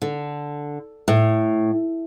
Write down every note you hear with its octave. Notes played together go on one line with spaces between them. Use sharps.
D3
A2